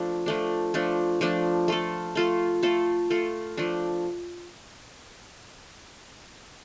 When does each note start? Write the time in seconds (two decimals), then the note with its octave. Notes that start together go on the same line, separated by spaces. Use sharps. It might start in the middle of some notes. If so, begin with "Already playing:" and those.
Already playing: F3 A3 D4
0.26 F3 A3 D4
0.74 F3 A3 D4
1.21 F3 A3 D4
1.68 A3 F4 A4
2.15 A3 F4 A4
2.63 A3 F4 A4
3.10 A3 F4 A4
3.57 F3 A3 D4